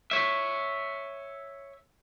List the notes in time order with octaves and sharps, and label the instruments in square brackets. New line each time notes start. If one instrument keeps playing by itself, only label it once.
[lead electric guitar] C#5 E5